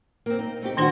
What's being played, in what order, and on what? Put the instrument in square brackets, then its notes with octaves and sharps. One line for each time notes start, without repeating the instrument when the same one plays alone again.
[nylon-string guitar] A#3 C4
D#4
A3 C4 G4
[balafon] D#3 D4 C5 [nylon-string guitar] G3 F#4